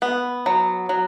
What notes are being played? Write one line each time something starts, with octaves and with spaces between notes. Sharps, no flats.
B3
F#3
F#3